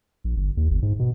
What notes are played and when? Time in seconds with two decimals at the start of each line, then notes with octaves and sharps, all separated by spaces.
0.24 A#1
0.37 G1
0.57 D#2
0.70 G1
0.82 G#2
0.99 B2